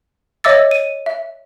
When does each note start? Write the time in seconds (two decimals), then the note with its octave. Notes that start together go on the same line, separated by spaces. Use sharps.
0.44 C#5 D#5 E5 D6 E6 A6
0.71 D#7
1.06 E5